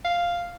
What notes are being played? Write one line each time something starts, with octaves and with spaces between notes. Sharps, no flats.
F5